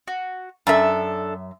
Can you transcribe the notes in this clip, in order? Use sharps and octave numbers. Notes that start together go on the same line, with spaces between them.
F#4
F#2 D4 A4 E5